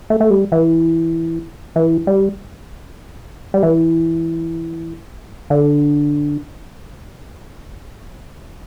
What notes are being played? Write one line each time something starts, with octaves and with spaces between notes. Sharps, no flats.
A3
A3
G3
E3
E3
G3
G3
E3
D3